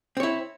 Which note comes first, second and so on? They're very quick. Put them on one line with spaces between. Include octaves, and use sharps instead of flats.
C4 C#5 E4